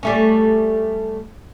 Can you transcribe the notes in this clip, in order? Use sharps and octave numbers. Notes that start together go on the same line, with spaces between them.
G3 A3 C#4